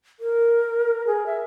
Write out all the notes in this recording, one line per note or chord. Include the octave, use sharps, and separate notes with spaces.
A#4
G#4
E5